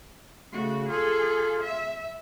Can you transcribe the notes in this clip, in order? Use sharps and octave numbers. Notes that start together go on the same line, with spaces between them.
C#3 A3 F#4
F4 G#4 A4
E5